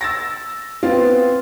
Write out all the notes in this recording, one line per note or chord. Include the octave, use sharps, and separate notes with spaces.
E6 A6 A#6
B3 C4 F4